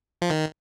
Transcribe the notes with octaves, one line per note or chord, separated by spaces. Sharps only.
F3
D#3